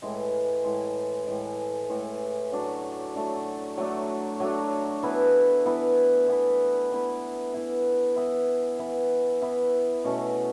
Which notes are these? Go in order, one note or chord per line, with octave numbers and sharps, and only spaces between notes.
A2 E3 G#3
A2 E3 G#3
A2 E3 G#3
A2 E3 G#3
F#3 A3 D4
F#3 A3 D4
F#3 A3 D4
F#3 A3 D4
E3 B3 E4 B4
E3 B3 E4 B4
E3 B3 E4 B4
E3 B3 E4 B4
E3 B3 E4
E3 B3 E4
E3 B3 E4
E3 B3 E4
B2 A3 C#4